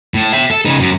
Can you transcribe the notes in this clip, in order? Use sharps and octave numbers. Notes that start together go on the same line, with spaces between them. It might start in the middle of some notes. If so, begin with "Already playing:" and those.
A2
E5 G5
A4
C#3 D#4
F#2